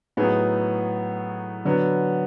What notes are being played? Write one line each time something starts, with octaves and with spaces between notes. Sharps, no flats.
A2 F#3 B3 D#4 G#4
D3 F#3 B3